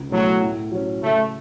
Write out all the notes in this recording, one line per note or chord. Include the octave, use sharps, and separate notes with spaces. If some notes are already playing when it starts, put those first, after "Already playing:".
Already playing: C#2
B2 F#3 A3 C#4 E4
A2
F#3 C#4
C#3 A3